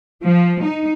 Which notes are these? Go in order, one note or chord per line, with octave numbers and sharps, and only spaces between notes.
F3
D#4